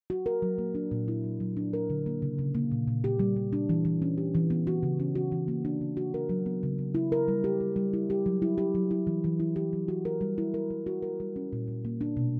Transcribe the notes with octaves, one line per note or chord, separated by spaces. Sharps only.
F#4
A#4
F#3
A#3
D4
A#2
E4
F#3
F#3
D4
A#4
D3
A#3
C#3
C#3
A#3
A#2
A#2
G4
G3
G3
D4
E3
E3
C#4
G4
E3
B3
F#4
C#3
C#4
F#4
E3
A#3
D4
C#3
F#4
A#4
F#3
B3
C#3
C#3
E4
A#4
G3
G4
G3
G3
E4
G4
F#3
E4
G4
F#3
E4
E3
E3
E4
G4
F#3
F#4
A#4
G3
E4
A#4
G3
F#4
A#4
G3
C#4
A#2
A#2
A#3
D4
B2